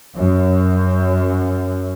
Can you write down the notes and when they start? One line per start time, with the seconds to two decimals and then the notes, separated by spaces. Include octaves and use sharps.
0.16 F#2